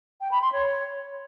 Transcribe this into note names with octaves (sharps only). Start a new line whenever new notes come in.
G5
B5
C6
C#5